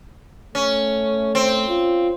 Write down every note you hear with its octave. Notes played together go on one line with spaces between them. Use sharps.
A3 C#4
C4
F4